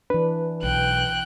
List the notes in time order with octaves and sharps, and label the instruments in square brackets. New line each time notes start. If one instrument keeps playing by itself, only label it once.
[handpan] E3 D4 [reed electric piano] B4
[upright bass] B1 [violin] G5 F#6